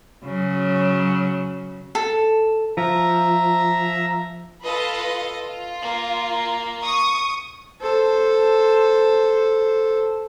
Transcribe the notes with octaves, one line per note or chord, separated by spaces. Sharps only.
C#3 F#3
A4
F3 E5 A#5
F4 A4 B4 D#5
F4
A#3
C#6 D#6
A4 C5